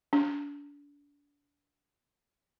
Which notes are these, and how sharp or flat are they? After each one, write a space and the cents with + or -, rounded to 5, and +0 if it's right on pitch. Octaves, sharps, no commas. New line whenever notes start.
D4 -35